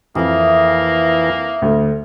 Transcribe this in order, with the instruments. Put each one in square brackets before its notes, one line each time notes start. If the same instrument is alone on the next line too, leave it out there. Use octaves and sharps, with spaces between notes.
[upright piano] F2 [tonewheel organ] E3 [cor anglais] A#3 [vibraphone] E5 D#6
[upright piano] D2